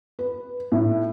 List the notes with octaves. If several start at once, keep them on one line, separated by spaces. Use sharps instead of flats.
B4
A2